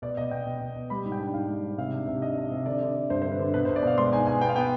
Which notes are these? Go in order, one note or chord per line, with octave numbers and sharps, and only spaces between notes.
B2 D5
B2 D#5
B2 G5
B2
B2
B2
G3 B5
G#2
G5
D4
G#2 F5
G3
G#2
C3 F5
D4
C3
D4 D#5
D4
C3
D3 D5
D3
D3
G2 C5
D3 C5
B4
D3
B2 B4
C5
B2
D5
B2 F5
G#3 C6
D#4 G#5
B2 G#5
B3 G5
F5
B3 G5